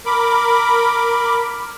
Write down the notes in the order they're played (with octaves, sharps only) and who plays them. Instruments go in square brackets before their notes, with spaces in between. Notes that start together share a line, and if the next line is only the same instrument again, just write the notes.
[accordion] A#4 B5 D6